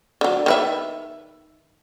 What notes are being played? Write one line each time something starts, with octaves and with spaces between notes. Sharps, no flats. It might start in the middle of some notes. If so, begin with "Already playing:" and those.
D3 F#3
D#3 B4 E5